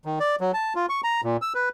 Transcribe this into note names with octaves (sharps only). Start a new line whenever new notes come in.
D#3
D5
F#3
A5
F4
C#6
A#5
A#2
E6
B4